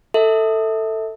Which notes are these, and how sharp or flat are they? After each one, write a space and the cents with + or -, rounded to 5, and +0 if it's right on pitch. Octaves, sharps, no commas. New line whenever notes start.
A4 +15 E5 -30